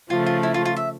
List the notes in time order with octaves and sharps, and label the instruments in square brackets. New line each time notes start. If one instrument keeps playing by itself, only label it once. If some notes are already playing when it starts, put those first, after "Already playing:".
[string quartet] C#3 F3 A3 [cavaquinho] F4
[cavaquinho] F4
E4
F4
F4
E5